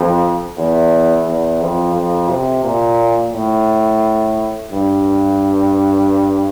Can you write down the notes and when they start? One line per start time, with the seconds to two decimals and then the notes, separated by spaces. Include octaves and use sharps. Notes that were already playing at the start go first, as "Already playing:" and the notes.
Already playing: F2
0.58 E2
1.27 E2
1.62 F2
1.95 F2
2.29 C3
2.65 A#2
3.33 A2
4.72 G2